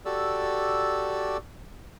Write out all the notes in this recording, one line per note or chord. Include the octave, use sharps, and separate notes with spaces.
F#4 G4 A4 D5 E6